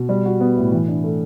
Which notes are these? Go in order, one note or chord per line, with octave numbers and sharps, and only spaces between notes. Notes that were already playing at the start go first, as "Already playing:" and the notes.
Already playing: B2
G3
F#4
B3
A2
E3
D4
A3